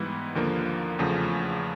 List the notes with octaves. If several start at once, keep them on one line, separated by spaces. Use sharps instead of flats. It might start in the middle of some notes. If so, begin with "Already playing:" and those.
Already playing: G#2 E3 G3 B3 E4
D#2 D3 F3 A#3
E2 C#3 F3 A3